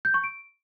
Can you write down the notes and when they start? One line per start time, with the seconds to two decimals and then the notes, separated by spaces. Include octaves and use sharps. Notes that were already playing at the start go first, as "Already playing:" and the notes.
0.05 G6
0.14 C#6
0.24 D7